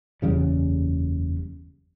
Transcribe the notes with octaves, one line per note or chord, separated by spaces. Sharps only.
F#1 E2 C#3 G3